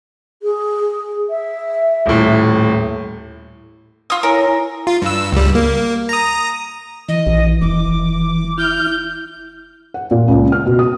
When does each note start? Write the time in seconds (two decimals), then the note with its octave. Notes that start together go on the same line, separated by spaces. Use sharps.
0.42 G#4
1.30 E5
2.06 D#1 A2
4.10 F4 D#6
4.23 E4 A#4 C#5 G#5
4.87 F4
5.02 G2 E6
5.32 C#2 G3
5.55 A#3
6.09 A#5 D#6
7.08 E3 D#5
7.27 A#1
7.61 F1 D6
8.58 E4 F6 G6
9.94 F#5
10.11 A#2
10.28 C#2
10.52 F6
10.66 B2
10.79 D#6